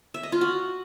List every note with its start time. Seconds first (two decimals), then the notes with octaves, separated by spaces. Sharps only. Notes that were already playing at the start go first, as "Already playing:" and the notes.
0.14 E5
0.23 D#5
0.32 F4
0.41 F#4